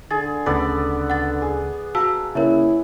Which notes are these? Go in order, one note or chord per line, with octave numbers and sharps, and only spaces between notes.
D3 G#4 A6
D2 C#3 B3 A4 D5 B5
F#5 A6
G#4
F#4 F5 A5 A#5 E6
C#3 A#3 E4 A#4 C#5 E5